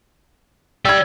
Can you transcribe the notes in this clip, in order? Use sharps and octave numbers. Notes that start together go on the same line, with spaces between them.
D5 G5 E6 G#6